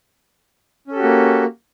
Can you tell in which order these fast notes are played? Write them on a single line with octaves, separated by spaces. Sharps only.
C#4 A4 G4 F#4 A#3